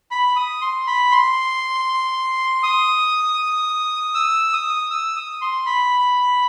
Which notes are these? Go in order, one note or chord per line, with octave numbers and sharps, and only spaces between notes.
B5
D#6
C6
B5
C6
D#6
E6
D#6
E6
D#6
C6
B5